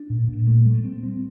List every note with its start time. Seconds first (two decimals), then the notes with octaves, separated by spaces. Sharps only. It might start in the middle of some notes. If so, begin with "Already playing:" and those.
Already playing: D4
0.10 A#2
0.28 A#2
0.47 A3
0.66 G3
0.85 C4
1.03 C4